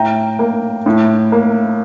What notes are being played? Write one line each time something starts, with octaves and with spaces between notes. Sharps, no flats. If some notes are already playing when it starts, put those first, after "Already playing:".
Already playing: A2 G5 A#5
A#3
A2
A#3